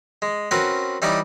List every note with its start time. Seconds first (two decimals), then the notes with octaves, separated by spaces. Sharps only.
0.22 G#3
0.51 C4 C#4 F#4 A#4 B4
1.02 E3 G3 D#4 C#5 D5 D6